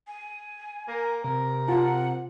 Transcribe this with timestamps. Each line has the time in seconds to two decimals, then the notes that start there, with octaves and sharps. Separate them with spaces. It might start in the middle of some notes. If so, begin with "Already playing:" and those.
0.07 G#5
0.88 A#3 A#4
1.24 C3 A#4
1.68 F4 F#5 A5